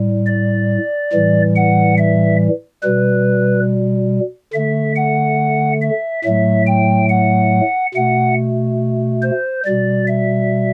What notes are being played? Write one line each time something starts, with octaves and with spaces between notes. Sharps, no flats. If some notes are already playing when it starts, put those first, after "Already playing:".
Already playing: A2 G3
D5
A2 E3 G3
F#5
E5
B2 G3 B4
D3 A3 E5
F#5
E5
A2 F#3 A3 E5
G5
F#5
B2 A3 F#5
C5
B2 G3 D5
E5